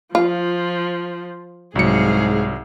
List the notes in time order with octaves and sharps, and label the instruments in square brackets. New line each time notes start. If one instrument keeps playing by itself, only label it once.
[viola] F3 [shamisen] F4
[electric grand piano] C2 F#3 C#7 [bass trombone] G#2 [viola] G#4 F5